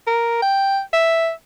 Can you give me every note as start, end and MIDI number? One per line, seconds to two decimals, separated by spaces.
0.07 0.40 70
0.42 0.80 79
0.93 1.31 76